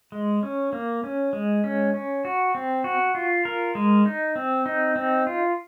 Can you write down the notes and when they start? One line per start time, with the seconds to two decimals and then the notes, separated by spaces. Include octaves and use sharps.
0.12 G#3
0.43 C#4
0.73 A#3
1.04 C#4
1.33 G#3
1.64 C#4
1.94 C#4
2.25 F#4
2.55 C4
2.84 F#4
3.15 F4
3.45 A#4
3.75 G#3
4.06 D#4
4.36 C4
4.66 D#4
4.96 C4
5.27 F4